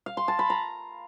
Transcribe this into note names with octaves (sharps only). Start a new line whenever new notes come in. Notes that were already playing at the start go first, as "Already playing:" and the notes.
F5
C6
A5
B5
A#5